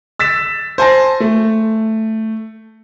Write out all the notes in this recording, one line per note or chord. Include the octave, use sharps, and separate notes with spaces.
E6 A6 B6 E7
C5 G#5 A5 A#6
A3